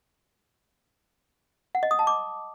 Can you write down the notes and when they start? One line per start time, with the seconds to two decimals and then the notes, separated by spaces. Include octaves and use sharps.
1.75 F#5
1.83 D#5
1.91 D#6
1.99 A5
2.07 D6